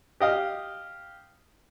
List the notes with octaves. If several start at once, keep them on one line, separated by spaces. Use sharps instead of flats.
G4 D#5 F5